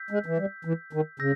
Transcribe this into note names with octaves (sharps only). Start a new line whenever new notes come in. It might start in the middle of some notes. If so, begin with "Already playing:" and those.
Already playing: E6 G6 B6
G#3
E3
G3
E3
D#3
C#3 E6 G6 A#6